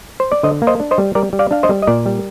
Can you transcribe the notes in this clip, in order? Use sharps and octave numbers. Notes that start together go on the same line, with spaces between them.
C5
D5
D3 C5 D#5
A#3
C5 D#5
D4
C5 D#5
G3
G3 A#4 D5
G3
D5 F5
D4 F5
C5 D#5
G3
D#5
A#2 A#4 D5
G3